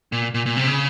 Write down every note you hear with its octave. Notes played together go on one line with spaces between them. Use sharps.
A#2
A#2
A#2
C3
C#3